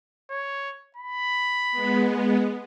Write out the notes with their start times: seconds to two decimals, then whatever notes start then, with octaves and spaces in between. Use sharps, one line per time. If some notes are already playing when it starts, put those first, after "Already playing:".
0.30 C#5
0.96 B5
1.71 G#3 B3